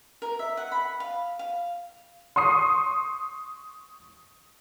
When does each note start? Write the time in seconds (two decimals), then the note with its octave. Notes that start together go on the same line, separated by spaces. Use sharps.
0.22 A#4
0.39 E5
0.57 F#5
0.72 B5
1.00 F5
1.39 F5
2.36 C6 C#6 D#6 C7